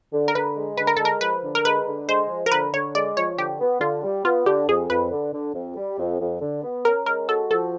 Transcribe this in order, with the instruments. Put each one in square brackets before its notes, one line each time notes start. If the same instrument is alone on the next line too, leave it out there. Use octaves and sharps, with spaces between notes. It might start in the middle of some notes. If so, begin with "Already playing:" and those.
[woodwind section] D3
[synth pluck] A#4
[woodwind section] D3 [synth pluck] B4
[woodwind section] G#3
[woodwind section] D3 [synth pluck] B4
[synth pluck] A#4
[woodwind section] G#3 [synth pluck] A4
[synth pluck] A#4
[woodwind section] F3 [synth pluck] B4
[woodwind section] D3
[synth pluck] A#4
[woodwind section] G#3 [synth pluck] B4
[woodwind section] D3
[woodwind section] G#3 [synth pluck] C5
[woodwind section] F3
[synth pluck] A#4
[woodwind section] D3 [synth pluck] B4
[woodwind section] D3 [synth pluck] C#5
[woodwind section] G#3 [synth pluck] D5
[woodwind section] F3 [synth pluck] C#5
[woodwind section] D3 [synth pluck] G4
[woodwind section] B3
[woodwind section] D3 [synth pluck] F4
[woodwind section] G3
[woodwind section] B3 [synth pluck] F4
[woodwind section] D3 [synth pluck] G4
[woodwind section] F2 [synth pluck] G#4
[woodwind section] F2 [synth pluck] B4
[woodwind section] D3
D3
F2
G3
F2
F2
D3
B3
[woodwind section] C#4 [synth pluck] A#4
[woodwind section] G#3 [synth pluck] A#4
[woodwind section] F#4 [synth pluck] A4
[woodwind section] F3 [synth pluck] A4